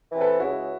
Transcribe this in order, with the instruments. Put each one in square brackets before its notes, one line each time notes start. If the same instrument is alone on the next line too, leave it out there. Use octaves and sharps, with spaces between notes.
[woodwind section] C3 E3
[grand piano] A4 B4
[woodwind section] C#2 [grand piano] E4 F#4